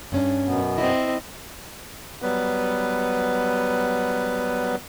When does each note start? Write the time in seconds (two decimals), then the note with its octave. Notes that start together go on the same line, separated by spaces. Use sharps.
0.12 G2 C#4 D4
0.46 F#2 B2 B3
0.78 C4 E4 D#5
2.22 F#3 G3 B3 B4